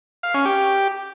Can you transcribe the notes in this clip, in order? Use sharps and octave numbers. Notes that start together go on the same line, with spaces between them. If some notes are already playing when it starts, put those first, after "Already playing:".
F5
C#4
G4